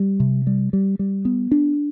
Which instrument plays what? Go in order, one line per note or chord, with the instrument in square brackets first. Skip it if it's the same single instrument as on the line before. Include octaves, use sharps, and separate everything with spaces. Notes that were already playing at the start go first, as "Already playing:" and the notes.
Already playing: [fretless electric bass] G3
C3
G3
G3
G3
B3
D4